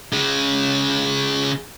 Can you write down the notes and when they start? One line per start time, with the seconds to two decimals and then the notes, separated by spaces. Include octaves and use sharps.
0.13 C#3 G#3